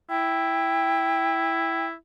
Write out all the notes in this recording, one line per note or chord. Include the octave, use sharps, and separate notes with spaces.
E4 G5